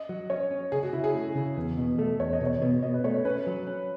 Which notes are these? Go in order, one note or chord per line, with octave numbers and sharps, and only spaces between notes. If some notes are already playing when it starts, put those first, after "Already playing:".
Already playing: D#5
F#3
C#4 C#5
C#4
C#3 G#4
F#4
C#3 E4
G#4
A3
C#3
E2
B2
A3 A4
E2 C#5
D#5
B2
C#5
B2
B2 D#5
B4
A3 C#5
C#4 B4
F#3
C#4